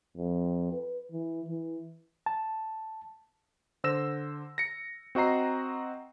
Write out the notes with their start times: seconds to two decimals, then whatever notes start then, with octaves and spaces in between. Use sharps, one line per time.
0.17 F2
0.73 B4
1.12 E3
1.48 E3
2.26 A5
3.84 D3 C5 E6 A#6 E7
4.58 A#6 C#7
5.15 C4 F#4 D#5 A#5 C7